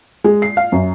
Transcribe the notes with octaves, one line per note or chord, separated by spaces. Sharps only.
G#3
C7
F5
F#2